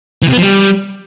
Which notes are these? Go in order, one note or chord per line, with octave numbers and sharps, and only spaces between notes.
E3
C3
B3
F3
G3